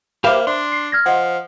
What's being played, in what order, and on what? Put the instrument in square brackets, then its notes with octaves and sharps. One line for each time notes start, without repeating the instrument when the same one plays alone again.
[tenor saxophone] A#3 [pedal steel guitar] G4 B4 F5 [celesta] C5 E5 E7
[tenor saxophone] D4 [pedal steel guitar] C6
[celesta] C7
F6 G#6 A#6
[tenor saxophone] F3 [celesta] D#5 F#5